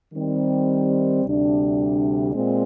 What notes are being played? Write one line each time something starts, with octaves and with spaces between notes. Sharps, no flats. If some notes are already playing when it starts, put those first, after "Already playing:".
D#3 G3 C4
D2 C3 G3 D4
A#2 G#3 C4